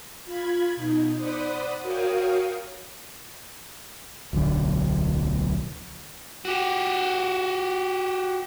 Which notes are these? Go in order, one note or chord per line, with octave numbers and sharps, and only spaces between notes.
F4 B5 G#6
B2 D#4
C5 D5 F#5 B5 D#6
F#4 A#4 C#5 F5 G5 D#6
D1 B1 D3 D4
F#4 G4